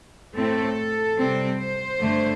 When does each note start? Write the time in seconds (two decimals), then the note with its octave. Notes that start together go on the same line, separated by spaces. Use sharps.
0.36 A2 A3 C4 A4
1.18 C3 G3 C4
1.59 C5
2.01 G2 D3 A3